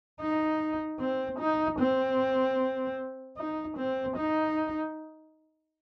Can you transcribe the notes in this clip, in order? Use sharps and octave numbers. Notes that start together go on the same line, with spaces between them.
D#4
C4
D#4
C4
D#4
C4
D#4